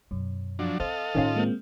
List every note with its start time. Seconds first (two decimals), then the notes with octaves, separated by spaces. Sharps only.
0.11 F#2 B2
0.59 F3 F#3 D4
0.80 C4 A4 C5 D#5 F5
1.15 A2 D#3 C#4 D4 F4
1.36 G#3 A#3 C4